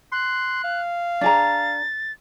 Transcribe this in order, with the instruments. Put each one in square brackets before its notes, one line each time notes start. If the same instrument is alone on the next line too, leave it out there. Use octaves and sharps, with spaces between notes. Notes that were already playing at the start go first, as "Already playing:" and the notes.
[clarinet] C6 [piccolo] F#6
[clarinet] F5
[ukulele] D4 G#4 A#5 [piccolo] A6